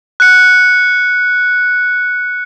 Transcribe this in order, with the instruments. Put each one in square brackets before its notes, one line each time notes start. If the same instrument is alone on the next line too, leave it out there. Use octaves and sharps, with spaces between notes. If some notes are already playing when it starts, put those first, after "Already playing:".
[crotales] F#6 C#7